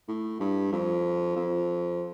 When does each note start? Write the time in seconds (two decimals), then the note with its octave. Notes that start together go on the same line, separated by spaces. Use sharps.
0.08 A2
0.40 G2
0.72 F2
1.36 F2